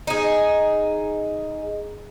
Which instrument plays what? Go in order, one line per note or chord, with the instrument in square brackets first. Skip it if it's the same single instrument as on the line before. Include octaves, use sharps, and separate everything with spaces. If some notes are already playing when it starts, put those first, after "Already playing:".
[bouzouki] D#4 G#4